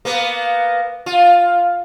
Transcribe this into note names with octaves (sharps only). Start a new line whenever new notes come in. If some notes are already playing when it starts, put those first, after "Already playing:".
A#3 B3
F4